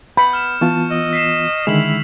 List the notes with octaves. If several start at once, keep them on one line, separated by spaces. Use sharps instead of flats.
B3 B5 G6 C#7
F6 E7
E3 B3 F4 A5 C#6
D#5 E6
B6 C7 E7
D3 D#3 G#3 E4 F7 F#7